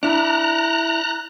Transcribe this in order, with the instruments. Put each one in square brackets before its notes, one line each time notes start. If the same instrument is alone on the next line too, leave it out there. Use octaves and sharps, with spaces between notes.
[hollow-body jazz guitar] D4 E4 [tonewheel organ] A#5 F#6